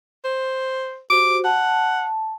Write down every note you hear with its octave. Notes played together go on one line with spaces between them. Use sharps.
C5
F#4 G4 C5 D6
F#5 A5